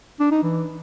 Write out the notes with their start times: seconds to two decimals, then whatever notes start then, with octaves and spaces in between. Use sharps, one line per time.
0.20 D4
0.31 D#4
0.43 E3